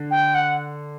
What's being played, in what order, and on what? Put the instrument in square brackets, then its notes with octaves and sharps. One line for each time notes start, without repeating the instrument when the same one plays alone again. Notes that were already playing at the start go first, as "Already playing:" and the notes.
Already playing: [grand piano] D3
[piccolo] G5
F#5